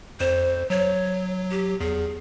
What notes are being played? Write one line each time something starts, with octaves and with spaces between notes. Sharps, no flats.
F2 C5
F#3 C#5
G4
E2 G#4